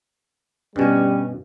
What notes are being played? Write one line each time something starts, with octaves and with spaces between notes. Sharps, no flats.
G2 B2 G3 C#4